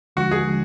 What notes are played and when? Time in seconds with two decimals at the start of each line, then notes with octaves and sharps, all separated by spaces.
0.16 D#2 D3 F3 G#3 F#4
0.31 G#4
0.48 D3 F3 G#3